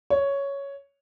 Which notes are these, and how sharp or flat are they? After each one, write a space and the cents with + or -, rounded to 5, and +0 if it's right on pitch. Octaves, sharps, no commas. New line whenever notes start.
C#5 +5